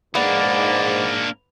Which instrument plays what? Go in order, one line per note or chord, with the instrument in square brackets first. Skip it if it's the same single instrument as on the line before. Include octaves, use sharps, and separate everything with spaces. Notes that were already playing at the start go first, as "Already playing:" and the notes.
[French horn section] G#2 [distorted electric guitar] A#3 D4 [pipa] B3 [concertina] D5